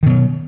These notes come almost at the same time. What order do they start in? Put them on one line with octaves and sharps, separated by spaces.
D#3 B2 F#3